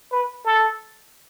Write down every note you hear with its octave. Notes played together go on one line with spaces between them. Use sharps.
B4
A4